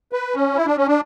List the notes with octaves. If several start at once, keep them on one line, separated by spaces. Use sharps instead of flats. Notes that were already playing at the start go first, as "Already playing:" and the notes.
B4
C#4
E4
D4
C#4
D4